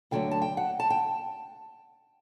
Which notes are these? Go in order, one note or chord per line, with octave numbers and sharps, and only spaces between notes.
D2 D3 F#3 A3 G5
A5
G5
F#5
A5
G5